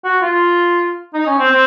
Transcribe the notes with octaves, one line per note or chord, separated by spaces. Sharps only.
F#4
F4
D#4
C#4
C4
C4